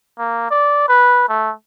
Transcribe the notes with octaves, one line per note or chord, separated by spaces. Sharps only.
A#3
D5
B4
A3